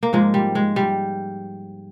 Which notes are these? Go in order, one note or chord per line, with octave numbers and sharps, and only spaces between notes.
A#3
G#2 F3 G#3
G3
G#3
G3